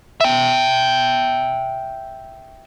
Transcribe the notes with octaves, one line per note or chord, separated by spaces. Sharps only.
E5 G5